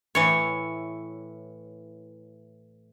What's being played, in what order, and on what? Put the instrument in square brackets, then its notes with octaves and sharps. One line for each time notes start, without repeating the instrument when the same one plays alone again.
[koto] A2 E3 C#5